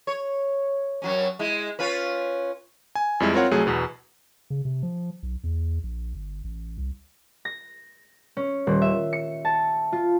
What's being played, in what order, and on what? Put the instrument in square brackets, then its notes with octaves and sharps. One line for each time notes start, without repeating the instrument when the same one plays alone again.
[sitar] C#5
F#2 F#3 C#4
G#3 E4
C#4 F4 B4
[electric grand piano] G#5
F2 G3 G#3 E4
C4 F4 A#4 C#5 F#5
C2 F#3 A3 G#4
E2 B2 B4
[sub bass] C#3
C3
F3
B1
E2
A#1
G1
A1
C2
[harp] A#6
C#4
D#1
E5
C#7
A5
F4